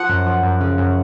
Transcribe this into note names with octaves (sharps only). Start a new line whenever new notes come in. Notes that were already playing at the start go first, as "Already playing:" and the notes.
Already playing: F3 F#5
F#2
F3
F#2
C#3
F#2